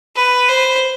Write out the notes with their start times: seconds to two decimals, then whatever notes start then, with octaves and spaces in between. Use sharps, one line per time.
0.16 B4
0.48 C5